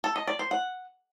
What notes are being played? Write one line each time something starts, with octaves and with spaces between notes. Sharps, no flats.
A4
D#5
D5
C5
F#5